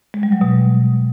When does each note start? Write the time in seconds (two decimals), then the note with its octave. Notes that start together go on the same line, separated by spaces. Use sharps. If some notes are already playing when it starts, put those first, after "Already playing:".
0.14 G#3
0.23 G3
0.32 F#3
0.41 B2